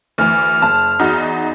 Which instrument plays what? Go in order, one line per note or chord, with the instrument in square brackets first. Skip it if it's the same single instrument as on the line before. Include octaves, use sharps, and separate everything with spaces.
[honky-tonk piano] D2 E3 [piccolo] F6
[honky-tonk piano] F#1 A5
E2 D#4 F#4